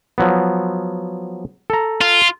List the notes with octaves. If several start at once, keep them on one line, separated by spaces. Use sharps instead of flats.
F3 F#3 B3
A4 A#5
F4